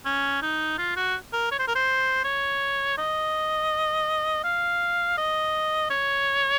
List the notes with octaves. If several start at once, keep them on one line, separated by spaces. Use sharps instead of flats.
C#4
D#4
F4
F#4
A#4
C#5
C5
A#4
C5
C#5
D#5
F5
D#5
C#5